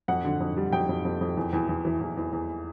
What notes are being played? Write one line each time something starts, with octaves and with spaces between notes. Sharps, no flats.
F2 F#5
D3
F2
G3
F2 G5
F2
F2
F2
E2
E2
E2
E3
E2
E2
E2